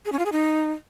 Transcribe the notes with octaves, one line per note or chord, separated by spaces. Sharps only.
G#4
C#4
F4
G#4
D#4